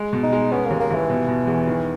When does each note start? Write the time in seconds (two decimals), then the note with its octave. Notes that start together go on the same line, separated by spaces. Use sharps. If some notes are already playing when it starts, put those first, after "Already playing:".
Already playing: G#3
0.13 B2
0.23 D#4
0.33 G#3
0.52 B3 C#4
0.66 A#3
0.71 D#2
0.80 A#3
0.91 D#2 E3
1.09 B2
1.28 B2
1.47 E2
1.67 D#3